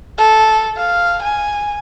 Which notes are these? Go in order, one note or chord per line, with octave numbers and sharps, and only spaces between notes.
A4
F5
G#5